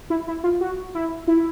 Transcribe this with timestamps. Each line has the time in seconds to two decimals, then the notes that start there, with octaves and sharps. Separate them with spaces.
0.10 E4
0.28 E4
0.44 F4
0.61 F#4
0.95 E4
1.28 E4